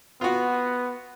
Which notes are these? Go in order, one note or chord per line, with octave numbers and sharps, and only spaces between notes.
B3 F4 F#4